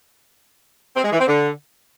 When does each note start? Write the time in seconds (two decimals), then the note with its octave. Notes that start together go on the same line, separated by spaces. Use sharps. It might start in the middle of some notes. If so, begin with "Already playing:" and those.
0.96 C4
1.04 G#3
1.12 E3
1.20 C4
1.28 D3